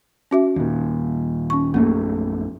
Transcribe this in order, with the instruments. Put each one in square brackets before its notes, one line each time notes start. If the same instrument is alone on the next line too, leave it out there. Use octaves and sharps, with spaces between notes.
[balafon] C#4 F#4 E5
[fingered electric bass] D#2 A#2
[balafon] C#4 C#6
[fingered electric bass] A#1 F#2 A3 [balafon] A#3